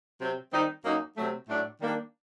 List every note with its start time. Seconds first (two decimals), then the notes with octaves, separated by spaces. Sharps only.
0.20 C3 F#3 C4
0.52 D#3 G3 C4 D#4
0.85 F#2 F#3 A#3 D#4
1.17 C3 F#3 A3
1.48 A2 F#3 A3 D4
1.80 D#3 G3 A#3 D4